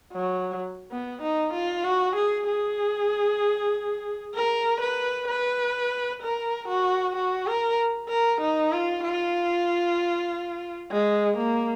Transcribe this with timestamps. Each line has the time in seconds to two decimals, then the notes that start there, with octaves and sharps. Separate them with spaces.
0.13 F#3
0.91 B3
1.22 D#4
1.53 F4
1.84 F#4
2.16 G#4
2.47 G#4
4.35 A#4
4.81 B4
5.28 B4
6.22 A#4
6.68 F#4
7.16 F#4
7.47 A#4
8.09 A#4
8.41 D#4
8.72 F4
9.03 F4
10.91 G#3
11.37 A#3